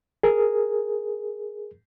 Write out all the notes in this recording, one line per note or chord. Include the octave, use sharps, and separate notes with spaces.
G#4 A#4